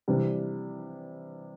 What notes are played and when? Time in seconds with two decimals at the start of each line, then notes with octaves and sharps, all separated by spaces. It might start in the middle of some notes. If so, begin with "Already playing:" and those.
0.08 C3 E3 G3 D4